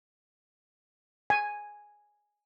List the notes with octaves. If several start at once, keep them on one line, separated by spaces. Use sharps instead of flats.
G#5